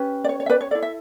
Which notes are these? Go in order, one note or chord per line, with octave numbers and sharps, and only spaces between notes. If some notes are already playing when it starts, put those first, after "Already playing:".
Already playing: C#4 G4 B4
D5
C#5
C#5
E5
B4 D5
C#5
E4 A4 D5
E5